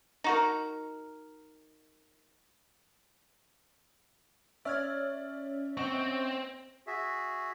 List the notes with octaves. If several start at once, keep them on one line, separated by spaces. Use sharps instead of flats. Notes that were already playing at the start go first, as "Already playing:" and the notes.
D#4 F#4 A#4
C#4 C#5 D5 E5 F6 G#6
C4 D#5 F#5 C#6
F#4 G#4 E5